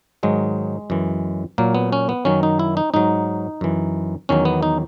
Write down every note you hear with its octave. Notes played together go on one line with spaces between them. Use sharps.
G#2 D#3 F#3 G#3
F#2 E3
A#2 F#3 A#3
B3
C#4
B3
F#2 D#3 F#3 C#4
D#4
E4
D#4
G#2 F#3 D#4
F#2 E3
E2 D#3 F#3 C#4
B3
D#4